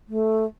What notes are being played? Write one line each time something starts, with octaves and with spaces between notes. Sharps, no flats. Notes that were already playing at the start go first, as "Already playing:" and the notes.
A3